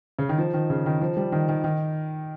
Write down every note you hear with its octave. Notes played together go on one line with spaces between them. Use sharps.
C#3
D#3
F3
D#3
C#3
D#3
F3
G3
D#3
D#3
D#3